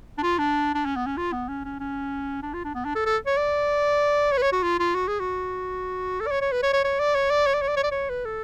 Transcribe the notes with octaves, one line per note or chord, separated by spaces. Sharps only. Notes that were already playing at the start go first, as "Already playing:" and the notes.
D4
F4
D4
D4
C#4
B3
C#4
F4
B3
C#4
C#4
C#4
D4
F4
D4
B3
D4
A4
A4
C#5
D5
C#5
B4
C#5
F#4
F4
F4
F#4
G#4
F#4
A4
D5
C#5
C#5
B4
C#5
C#5
C#5
D5
C#5
D5
C#5
D5
C#5
D5
C#5
D5
C#5
B4
A4